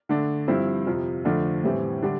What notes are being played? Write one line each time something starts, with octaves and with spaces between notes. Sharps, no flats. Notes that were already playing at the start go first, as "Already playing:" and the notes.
D3 A3 D4
G2 F3 C4 E4
F2 C3 F3
F2 D3 F3 A3 D4
A2 E3 G3 C4
D3 G3 D4